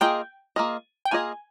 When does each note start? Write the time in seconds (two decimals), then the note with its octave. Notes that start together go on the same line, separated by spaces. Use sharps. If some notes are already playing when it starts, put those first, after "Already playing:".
0.01 A#3 F4 G#4 D#5 G5
0.56 A#3 F4 G#4 D#5
1.05 G5
1.11 A#3 F4 G#4 D#5 G#5